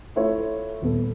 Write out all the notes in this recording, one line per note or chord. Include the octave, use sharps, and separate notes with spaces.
A3 E4 F4 C#5
D#1 B3 A4